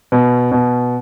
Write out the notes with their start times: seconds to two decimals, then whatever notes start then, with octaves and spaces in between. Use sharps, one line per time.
0.12 B2
0.52 B2